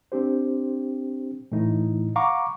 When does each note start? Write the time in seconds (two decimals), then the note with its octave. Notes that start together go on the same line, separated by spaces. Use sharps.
0.12 C4 D4 G4 C5
1.52 A2 E3 A3 D#4 E4
2.16 F5 F#5 A#5 B5 C#6 D6